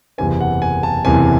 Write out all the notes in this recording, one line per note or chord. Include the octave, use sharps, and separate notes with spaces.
F#1 E2 C3 E3 C4 G#5
F#5
G#5
A5
F#1 E2 C3 E3 C4 G#5